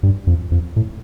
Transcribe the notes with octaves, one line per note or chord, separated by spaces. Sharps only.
G2
F2
F2
A2